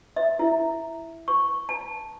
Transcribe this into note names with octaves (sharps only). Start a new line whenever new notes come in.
E5
E4
C#6
A5